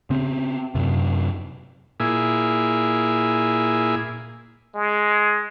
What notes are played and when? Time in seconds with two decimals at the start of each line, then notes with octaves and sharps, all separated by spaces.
0.10 C#3 C4
0.75 F#2 C3
2.00 A#2 E4 G#4
4.75 G#3